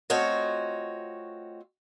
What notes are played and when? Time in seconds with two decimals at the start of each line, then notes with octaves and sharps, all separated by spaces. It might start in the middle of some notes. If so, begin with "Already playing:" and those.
0.10 A3 C4 F4 F#4 C#5 D#5